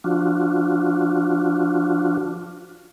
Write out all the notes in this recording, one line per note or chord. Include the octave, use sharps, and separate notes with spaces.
F3 D4 F4 F#4